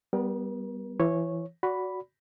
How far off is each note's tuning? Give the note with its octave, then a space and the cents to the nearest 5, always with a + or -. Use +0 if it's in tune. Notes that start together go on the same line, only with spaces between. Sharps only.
G3 +0 B3 +5 A#4 +40
E3 +20 C#5 -10
F#4 +0 D5 -30 B5 +0